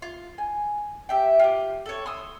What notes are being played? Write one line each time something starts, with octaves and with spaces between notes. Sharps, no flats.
F4
G#5
G4 E5 G5
F4 G4
A4 C#5
C6 D#6 E6